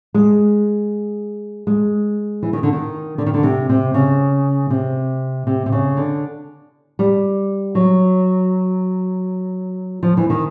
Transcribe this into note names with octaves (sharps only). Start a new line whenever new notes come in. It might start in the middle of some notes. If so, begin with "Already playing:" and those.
G#3
G#3
E3
D#3
D3
D#3
D3
D#3
D3
C3
C3
C#3
C3
C3
C3
C#3
D3
G3
F#3
F3
E3
D#3